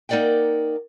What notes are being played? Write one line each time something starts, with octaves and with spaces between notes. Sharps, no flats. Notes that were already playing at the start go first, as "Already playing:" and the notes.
A#3 D#4 A#4 D5 F#5 G5